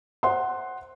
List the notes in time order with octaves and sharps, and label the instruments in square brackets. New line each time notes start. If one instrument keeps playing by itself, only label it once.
[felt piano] C5 F#5 C6